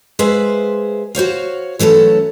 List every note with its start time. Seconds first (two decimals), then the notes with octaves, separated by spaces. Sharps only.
0.19 G#3 G#4 B4 C5 E5 F5
1.15 F#4 C5 C#5 F5
1.79 E3 F#3 A3 C#4 A4